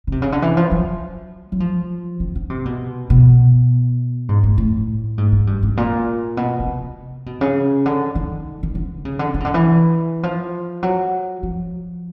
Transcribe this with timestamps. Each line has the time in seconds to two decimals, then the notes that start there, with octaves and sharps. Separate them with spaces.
0.07 C#3
0.12 C3
0.22 C#3
0.32 D3
0.42 E3
0.57 F3
0.71 F#3
1.52 F#3
1.60 F3
2.20 D#3
2.35 D3
2.50 C3
2.65 B2
3.10 B2
4.29 G#2
4.44 A2
4.58 A2
5.18 G#2
5.32 G#2
5.47 G2
5.63 G#2
5.77 A#2
6.37 B2
6.60 B2
6.67 C3
7.26 B2
7.41 C#3
7.86 D3
8.15 D#3
8.63 D#3
8.75 D3
9.05 C#3
9.19 D3
9.34 D3
9.40 C#3
9.45 D3
9.54 E3
10.23 F3
10.83 F#3
11.43 F3